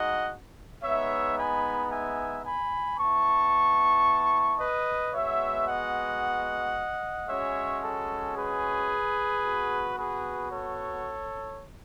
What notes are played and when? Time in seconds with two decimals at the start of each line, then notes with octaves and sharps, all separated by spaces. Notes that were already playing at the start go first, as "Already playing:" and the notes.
Already playing: G#3 D#4 F#4 D#5 F#5
0.83 G#3 B3 D#4 C#5 E5
1.37 G#5 B5
1.90 E5 G#5
2.44 G#5 B5
2.98 B3 E4 A5 C#6
4.59 B4 D#5
5.13 G#3 B3 F#4 C#5 E5
5.67 D#5 F#5
7.28 G#3 C#4 F#4 C#5 E5
7.83 A4
8.36 G#4 B4
9.44 B3 F#4
9.97 G#4 B4
10.51 A4 C#5